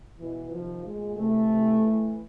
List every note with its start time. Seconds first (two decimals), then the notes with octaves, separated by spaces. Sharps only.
0.19 B2 E3
0.51 C3 D#3 F3
0.84 A#2 G#3
1.16 C3 E3 A3
1.48 C3 E3
1.81 A2 E3